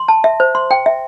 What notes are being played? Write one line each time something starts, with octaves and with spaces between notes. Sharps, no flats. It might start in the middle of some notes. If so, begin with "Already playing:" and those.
Already playing: C6
A5
E5
C5
C6
G5
E5